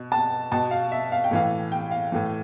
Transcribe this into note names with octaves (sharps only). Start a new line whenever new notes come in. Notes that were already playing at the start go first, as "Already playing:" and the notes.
Already playing: B2
A5
B2 A5
F5
E5
F5
G5
A2 E3 F5
G5
F5
A2 E3